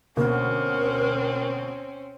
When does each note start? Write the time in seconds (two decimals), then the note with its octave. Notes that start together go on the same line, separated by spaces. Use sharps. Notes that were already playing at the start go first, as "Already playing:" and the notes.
0.17 D2 B2 A#3 C4 C#4 A#4